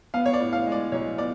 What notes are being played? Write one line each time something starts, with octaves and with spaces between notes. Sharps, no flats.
B3 F5
C#5
D5
A2
F5
G#3
D5
B1 C#5
B3 D5